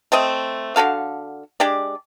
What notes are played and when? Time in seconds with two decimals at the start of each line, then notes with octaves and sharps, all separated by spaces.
0.12 A3 C4 D#5
0.76 D3 F#4 A4 F5
1.60 G#3 D4 G4 D5